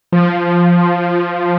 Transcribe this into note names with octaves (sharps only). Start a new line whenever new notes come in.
F3